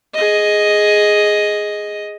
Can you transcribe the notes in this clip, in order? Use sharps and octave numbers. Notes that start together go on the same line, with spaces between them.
G#4 D#5